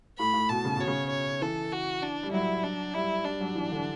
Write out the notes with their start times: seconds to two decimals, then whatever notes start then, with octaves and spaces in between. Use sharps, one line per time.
0.18 A2 B5
0.33 A2
0.49 B2 A5
0.65 C#3
0.76 B2 C#5
0.87 C#3
1.10 C#5
1.41 E3 A4
1.72 F#4
2.03 D4
2.23 G3
2.32 F#3 E4
2.63 D4
2.94 G3 E4
3.24 G3 D4
3.41 F#3
3.55 E3
3.71 D3